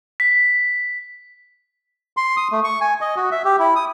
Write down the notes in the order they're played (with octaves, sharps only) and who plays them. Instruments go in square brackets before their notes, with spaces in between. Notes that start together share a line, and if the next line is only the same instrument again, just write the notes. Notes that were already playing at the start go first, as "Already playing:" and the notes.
[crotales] B6
[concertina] C6
D#6
A3
C#6
G#5
D#5
F#4
E5
G4
E4
D#6